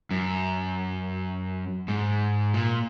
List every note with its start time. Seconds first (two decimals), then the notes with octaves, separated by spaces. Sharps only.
0.11 F#2
1.88 G#2
2.54 A#2